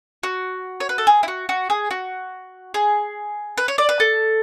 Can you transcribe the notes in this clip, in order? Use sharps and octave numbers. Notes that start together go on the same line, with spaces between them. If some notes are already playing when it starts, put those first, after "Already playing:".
F#4
C#5
B4
A4
G#4
E4
F#4
F#4
G#4
F#4
G#4
B4
C#5
D5
B4
A4